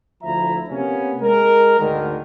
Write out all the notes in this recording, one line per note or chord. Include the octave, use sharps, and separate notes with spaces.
D2 F3 E4 E5 A#5
C3 A#3 B3 C#4
G#3 A#4
D2 G#2 D3 D#3